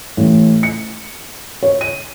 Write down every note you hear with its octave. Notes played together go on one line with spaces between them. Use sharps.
A1
C#7
C#5
D#7